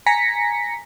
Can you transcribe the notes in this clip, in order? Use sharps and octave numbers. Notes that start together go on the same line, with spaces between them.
G#5 A#5 A#6 B6 C#7